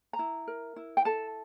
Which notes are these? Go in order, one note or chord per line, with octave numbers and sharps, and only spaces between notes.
A#5
E4
A#4
E4
G5
A4 A5